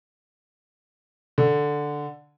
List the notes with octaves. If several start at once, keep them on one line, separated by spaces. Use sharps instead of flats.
D3